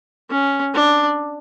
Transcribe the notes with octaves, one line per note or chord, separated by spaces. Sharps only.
C#4
D4